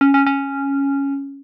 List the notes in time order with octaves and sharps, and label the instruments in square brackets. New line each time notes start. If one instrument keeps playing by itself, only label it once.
[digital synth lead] C#4
C#4
C#4